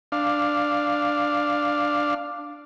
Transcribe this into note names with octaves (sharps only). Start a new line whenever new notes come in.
D4 F5